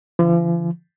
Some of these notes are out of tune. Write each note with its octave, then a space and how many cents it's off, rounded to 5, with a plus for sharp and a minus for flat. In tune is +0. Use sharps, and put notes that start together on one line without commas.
D3 -25 F3 -45